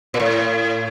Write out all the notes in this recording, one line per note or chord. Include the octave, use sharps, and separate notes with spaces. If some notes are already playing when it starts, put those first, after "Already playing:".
A#2
A2